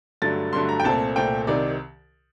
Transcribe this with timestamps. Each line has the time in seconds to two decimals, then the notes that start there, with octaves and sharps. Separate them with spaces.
0.22 G2 D3 F#3 A3 A6
0.53 G2 D3 F#3 A3 C6
0.69 A#5
0.80 G5
0.84 C2 A#2 A3 C4 A5
1.16 C2 A#2 A3 C4 G5
1.47 C2 C3 D#3 D5